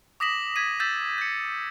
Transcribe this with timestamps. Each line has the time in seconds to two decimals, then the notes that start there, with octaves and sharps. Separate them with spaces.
0.20 D6 D#6 A#6 B6 E7 F#7
0.56 G#6 B6 D#7
0.80 E6 G6 A6 B6 E7 F#7
1.18 G6 C#7